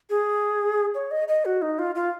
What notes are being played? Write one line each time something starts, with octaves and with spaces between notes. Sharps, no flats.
G#4
C#5
D#5
D#5
F#4
D#4
F4
F4